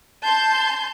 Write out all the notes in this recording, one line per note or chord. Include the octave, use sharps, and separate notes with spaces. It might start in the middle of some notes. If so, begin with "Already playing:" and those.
A5 C6 G6